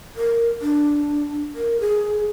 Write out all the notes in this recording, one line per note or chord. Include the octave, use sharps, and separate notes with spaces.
A#4
D4
A#4
G#4